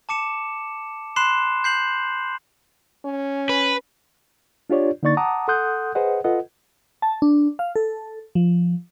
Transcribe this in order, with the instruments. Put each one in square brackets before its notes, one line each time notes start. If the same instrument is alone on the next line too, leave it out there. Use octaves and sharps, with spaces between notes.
[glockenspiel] A5 D6 C#7 E7
B5 C6 F#6 C7 E7
G6 C7 F#7
[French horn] C#4
[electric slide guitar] B4
[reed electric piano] D4 F4 G4 C#5 D5
D3 A#3 D#4 D5 C#6 A6
F#5 A5 A#5 D6 D#6
A4 F#5 C6 D#6 F#6 G6
G#4 B4 C5 D#5 F#5
F4 A4 B4 D#5 F#5
[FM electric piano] A5
D4
F5
A4
F3